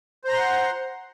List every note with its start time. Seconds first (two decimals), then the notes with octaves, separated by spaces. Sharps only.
0.24 C5
0.29 A#5
0.33 C6
0.37 F#5